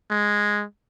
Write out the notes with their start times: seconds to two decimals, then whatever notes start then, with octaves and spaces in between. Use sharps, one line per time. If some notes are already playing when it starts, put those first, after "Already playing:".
0.10 G#3